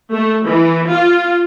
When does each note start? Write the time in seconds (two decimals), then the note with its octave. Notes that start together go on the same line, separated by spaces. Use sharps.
0.11 A3
0.45 E3
0.89 F4